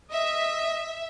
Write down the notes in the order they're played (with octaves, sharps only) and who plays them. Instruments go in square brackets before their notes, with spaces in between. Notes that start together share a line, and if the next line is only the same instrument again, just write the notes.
[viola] D#5 [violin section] E5